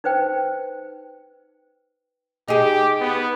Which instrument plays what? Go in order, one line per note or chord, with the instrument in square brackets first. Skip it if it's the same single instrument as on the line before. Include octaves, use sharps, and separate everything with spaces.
[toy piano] D#4 B4 C5 G5
[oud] D#4 G#4 [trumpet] G4
[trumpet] B3